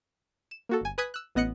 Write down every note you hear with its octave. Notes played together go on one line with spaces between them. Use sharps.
E7
A#3 F#4 A4
G1 G#5
B4 G#5 D#6 F#6 G#6 B6
E6 F#6
A1 B3 D#5 F#6 C#7